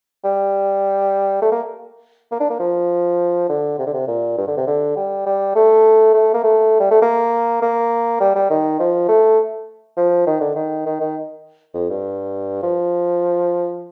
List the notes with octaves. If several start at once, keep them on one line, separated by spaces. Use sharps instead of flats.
G3
A3
A#3
A#3
D4
A#3
F3
D3
C3
D3
C3
A#2
G2
D3
C3
D3
G3
G3
A3
A3
A#3
A3
G3
A3
A#3
A#3
G3
G3
D#3
F3
A3
F3
D#3
D3
D#3
D#3
D#3
F2
G2
F3